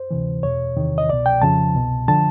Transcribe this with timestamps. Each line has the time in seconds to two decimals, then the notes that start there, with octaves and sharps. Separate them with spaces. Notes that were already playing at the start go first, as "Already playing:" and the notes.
Already playing: C5
0.11 D2 C3 E3
0.43 E2 B2 C#5
0.76 E2 C3 D#3
0.98 D#5
1.09 C2 B2 D5
1.26 G5
1.41 F2 C#3 F3 A5
1.75 C2 B2
2.08 D3 F3 A5